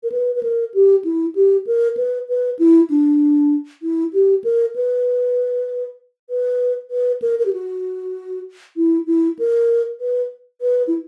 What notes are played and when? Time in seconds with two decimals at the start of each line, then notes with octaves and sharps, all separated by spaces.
0.03 A#4
0.12 B4
0.35 B4
0.43 A#4
0.74 G4
1.05 E4
1.35 G4
1.67 A#4
1.97 B4
2.29 B4
2.59 E4
2.90 D4
3.83 E4
4.13 G4
4.44 A#4
4.76 B4
6.30 B4
6.91 B4
7.22 A#4
7.39 A#4
7.46 G4
7.53 F#4
8.77 E4
9.07 E4
9.39 A#4
10.01 B4
10.61 B4
10.87 E4